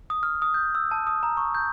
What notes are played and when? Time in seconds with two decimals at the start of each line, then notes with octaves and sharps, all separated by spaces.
0.10 D#6
0.23 F6
0.42 D#6
0.54 G6
0.75 E6
0.91 A5
1.07 D#6
1.23 A#5
1.37 C#6
1.55 G6